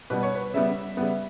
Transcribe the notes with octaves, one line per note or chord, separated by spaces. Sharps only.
B2 G3 B3 B4
C#5
B4
C#3 G3 B3 E5
C#3 G3 B3